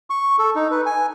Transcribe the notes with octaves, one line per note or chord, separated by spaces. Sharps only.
C#6
A4
D#4
B4
G#5